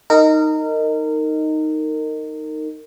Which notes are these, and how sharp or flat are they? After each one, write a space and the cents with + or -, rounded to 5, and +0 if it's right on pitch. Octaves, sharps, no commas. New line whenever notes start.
D#4 +0 A#4 -25